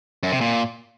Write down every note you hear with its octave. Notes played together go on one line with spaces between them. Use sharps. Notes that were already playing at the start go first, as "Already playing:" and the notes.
F#2
C3
A#2